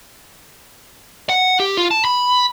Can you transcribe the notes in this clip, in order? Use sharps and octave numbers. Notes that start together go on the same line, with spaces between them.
F#5
G4
F4
A5
B5